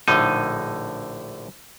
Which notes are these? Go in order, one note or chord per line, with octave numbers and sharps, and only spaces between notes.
A#1 A2 D3 D#4 D#5